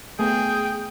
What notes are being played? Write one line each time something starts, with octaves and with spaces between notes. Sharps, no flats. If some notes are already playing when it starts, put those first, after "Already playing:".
A3 B3 G#4 G5